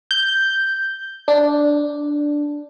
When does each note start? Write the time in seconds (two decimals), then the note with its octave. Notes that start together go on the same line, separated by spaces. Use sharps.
0.11 G6
1.28 D4